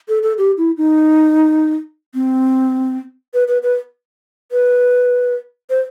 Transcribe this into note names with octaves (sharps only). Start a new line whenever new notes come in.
A4
A4
G4
E4
D#4
C4
B4
B4
B4
B4
C5